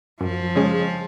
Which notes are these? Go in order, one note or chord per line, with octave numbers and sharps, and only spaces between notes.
F#2 F3
C#3 G#3 C#4 G#4